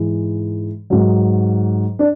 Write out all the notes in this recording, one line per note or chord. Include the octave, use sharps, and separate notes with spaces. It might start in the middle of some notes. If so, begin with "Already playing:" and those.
Already playing: G#2 E3 G#3
G#2 F#3
D4